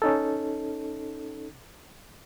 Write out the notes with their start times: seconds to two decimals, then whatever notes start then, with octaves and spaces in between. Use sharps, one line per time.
0.02 C#4 D#4 A4